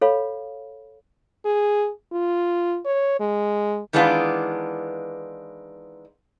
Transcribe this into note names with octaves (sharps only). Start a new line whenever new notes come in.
A4 C#5 F5 B5
G#4
F4
C#5
G#3
D#3 E3 G#3 B3 D4 F4